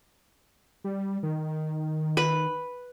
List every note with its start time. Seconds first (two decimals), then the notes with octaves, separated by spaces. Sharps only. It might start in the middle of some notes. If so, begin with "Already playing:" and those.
0.84 G3
1.23 D#3
2.17 B4